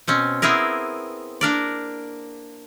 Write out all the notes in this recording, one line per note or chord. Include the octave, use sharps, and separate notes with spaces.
B2 C4 C#4
B3 C4 E4 G#4 A#4
A#3 D4 A#4 D5